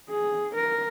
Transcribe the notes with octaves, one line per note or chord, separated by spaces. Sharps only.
G#4
A#4